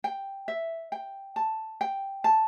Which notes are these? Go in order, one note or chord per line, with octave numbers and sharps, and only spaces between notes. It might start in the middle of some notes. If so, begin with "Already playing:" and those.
G5
E5
G5
A5
G5
A5